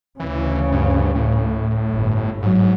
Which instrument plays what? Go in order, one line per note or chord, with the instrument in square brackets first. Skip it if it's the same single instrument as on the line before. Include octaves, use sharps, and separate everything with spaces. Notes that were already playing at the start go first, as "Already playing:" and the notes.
[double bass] D2 C#3 [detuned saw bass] E3
[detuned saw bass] G2
A2
[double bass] G1
[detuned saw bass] G#2 [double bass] F#3